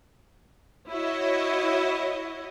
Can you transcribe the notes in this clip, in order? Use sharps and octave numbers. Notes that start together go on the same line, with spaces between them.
E4 F#4 C#5 D#5